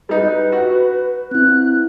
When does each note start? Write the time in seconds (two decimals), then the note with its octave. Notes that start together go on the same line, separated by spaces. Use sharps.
0.09 G3 D#4 B4
0.52 F#4
1.31 C4 E4 F#6